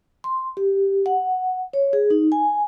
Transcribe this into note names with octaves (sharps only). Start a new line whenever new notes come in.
C6
G4
F#5
C#5
G#4
D#4
G#5